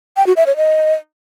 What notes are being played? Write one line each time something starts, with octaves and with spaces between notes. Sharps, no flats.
G5
F#4
E5
C#5
D#5